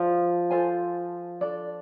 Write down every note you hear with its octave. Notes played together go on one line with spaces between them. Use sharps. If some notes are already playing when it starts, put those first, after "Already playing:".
Already playing: F3 G#4 D5
F4 A4 C5 G#5
D4 A4 D5